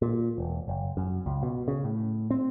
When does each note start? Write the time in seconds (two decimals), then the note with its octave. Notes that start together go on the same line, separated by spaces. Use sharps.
0.02 A#2
0.38 E1
0.68 F#1
0.97 F#2
1.26 C#2
1.43 B2
1.68 C#3
1.84 A2
2.31 C4